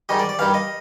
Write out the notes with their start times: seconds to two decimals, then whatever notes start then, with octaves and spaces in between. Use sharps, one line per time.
0.09 G#2 D#3 G3 D#5
0.19 D5
0.29 D5
0.39 G2 D#3 G3 F5
0.54 D#5